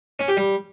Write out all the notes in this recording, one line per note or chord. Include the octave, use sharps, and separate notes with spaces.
C#4
G4
G3